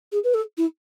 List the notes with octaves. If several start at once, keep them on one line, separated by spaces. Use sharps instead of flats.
G#4
B4
A4
E4